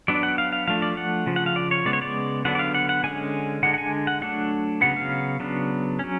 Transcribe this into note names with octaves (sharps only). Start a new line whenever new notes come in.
F#3 B3 D4 D5
F#5
F5
F5
F3 A3 D4 F5
D5
F#5
C#3 F3
F#5
F5
D5
C#5
C#3 G#3 B3 D5
C#5
D5
D3 F#3 B3 D4 F#5
D5
F5
F#5
F#5
D3 G#3 C#4 G#5
D3 G#3 D4 F#5
F#5
G#5
F#5
F#3 A3 D4 F#5
C#3 F#3 B3 F#5
F5
C#3 F#3 B3 D4
F#3 C#4